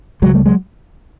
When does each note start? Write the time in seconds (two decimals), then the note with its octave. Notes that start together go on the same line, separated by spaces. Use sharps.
0.22 C#2 C#3 F#3 G#3
0.34 G3 A3
0.46 F#3 G#3